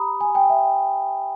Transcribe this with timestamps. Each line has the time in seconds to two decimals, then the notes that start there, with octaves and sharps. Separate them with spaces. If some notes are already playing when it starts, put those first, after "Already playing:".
Already playing: G4 A#5 B5 D#6
0.21 G#5
0.35 G5
0.50 E5